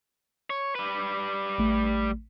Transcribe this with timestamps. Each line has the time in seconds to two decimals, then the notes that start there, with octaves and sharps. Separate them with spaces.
0.50 C#5
0.75 G3 B4
1.58 A1 A3